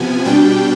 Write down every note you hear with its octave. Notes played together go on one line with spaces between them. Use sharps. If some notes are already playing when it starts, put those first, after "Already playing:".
Already playing: C3 F3 B3 G#5
B2 G3 D4 G5